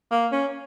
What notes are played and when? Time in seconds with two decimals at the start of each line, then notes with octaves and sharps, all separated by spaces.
0.12 A#3
0.32 C#4